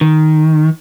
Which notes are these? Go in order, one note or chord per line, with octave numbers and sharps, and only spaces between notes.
D#3